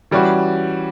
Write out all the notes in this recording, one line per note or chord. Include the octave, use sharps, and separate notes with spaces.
E3 G3 C#4 F#4